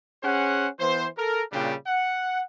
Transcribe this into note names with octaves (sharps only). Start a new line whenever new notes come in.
C#4 G#4 C5 F#5
E3 B3 C5
A4 A#4
A#2 C#3 G3 D4 G5
F#5